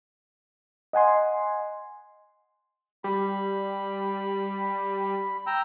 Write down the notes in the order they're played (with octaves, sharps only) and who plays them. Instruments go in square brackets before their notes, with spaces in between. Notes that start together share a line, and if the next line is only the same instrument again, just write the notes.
[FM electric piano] D#5 F#5 G#5 C6
[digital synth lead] G3 [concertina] B5
[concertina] G5 A#5 E6